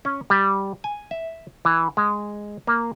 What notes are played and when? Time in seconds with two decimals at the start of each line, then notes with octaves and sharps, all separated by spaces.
0.05 C#4
0.30 G3
0.84 G#5
1.11 E5
1.65 E3
1.97 G#3
2.67 A#3